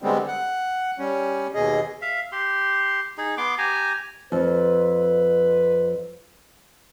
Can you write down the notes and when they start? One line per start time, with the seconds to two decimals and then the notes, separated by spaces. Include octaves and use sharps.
0.02 D3 G3 G#3 B3 C4
0.28 F#5
0.99 G3 C#4
1.54 D#2 B2 G#4 D#5
2.02 E5 F5
2.32 G4 C6
3.18 D#4 G#4
3.38 B3 C6 D6
3.58 G4 G#5 A#5
4.32 F2 B4